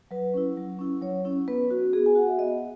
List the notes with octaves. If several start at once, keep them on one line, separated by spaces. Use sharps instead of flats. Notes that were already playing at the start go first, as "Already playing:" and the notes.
F#3 B4
C#4 E4
F#3
C#4 E4
F#3 C#5
C#4 E4
B3 B4
F#4
B3 G#4
G#5
F#4 F#5
E5
B3 D#5